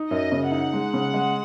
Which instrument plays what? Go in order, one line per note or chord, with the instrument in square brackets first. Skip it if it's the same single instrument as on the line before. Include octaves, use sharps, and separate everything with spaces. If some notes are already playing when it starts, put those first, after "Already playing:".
Already playing: [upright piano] D#4
[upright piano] F#2 [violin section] D#5
[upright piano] C#3
[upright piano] D#4 [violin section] F#5
[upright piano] G#3
C#3
G#3